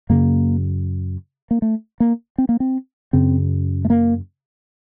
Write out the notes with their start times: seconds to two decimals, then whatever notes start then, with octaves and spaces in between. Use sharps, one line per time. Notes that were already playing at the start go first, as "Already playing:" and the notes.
0.09 F#2 C#3 A#3
1.51 A#3
1.62 A3
2.00 A#3
2.38 C4
2.49 A#3
2.60 C4
3.13 F#2 C#3 C4
3.85 A3
3.90 A#3